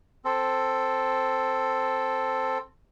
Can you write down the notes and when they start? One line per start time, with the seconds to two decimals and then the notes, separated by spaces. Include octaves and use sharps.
0.25 C4 A4